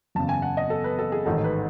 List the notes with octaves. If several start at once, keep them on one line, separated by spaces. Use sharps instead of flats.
F#1 E2 C#3 A5
G#5
F#5
D#5
A4
B4
A4
G#4
A1 G#2 D#3 A4
B4